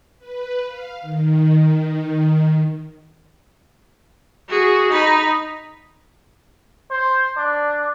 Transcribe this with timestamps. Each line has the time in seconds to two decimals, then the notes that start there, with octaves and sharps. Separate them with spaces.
0.18 B4
0.67 F5
1.01 D#3
4.49 F#4 G#4
4.92 D#4 B5
6.91 C5
7.37 D4